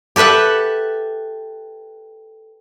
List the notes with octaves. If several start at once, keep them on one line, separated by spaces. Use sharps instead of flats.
G4 A4 B4 E5 F#5